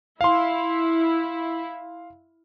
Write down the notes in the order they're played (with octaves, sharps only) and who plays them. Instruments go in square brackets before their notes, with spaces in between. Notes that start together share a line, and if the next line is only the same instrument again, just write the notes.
[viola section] E4 [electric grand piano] F5 C6